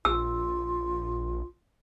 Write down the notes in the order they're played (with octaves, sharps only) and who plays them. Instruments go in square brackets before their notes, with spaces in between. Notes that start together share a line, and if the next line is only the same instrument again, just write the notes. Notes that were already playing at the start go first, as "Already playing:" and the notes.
[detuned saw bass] A#1 [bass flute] F4 [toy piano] E6